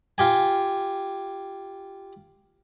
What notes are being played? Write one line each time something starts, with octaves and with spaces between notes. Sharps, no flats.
F4 G4 G#5